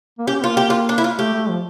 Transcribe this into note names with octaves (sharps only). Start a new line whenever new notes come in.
A#3
C#4 G4
A#3 F4
G4
F4
D4
E4
F4
A3 G4
A3
F3